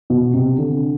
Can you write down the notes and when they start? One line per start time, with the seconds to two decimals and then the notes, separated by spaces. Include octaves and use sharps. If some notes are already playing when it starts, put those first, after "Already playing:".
0.10 B2
0.34 C3
0.58 D3